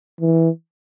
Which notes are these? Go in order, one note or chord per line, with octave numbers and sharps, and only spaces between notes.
E3